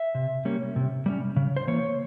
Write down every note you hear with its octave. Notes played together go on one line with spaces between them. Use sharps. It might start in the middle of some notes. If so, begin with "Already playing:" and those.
Already playing: E5
C3
G3 A#3 C#4
C3
G3 A#3 C#4
C#3
C5
E3 A#3 C#5